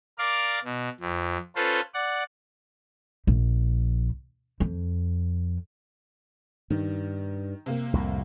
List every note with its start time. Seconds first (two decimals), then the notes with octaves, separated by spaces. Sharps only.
0.18 A#4 D5 F5 D6
0.64 B2
1.00 F2
1.56 C#4 F4 A4 B4 C5
1.94 D5 F#5
3.27 A#1
4.60 F2
6.70 G2 D#3
7.66 C3 A#3
7.93 C2 F2 A2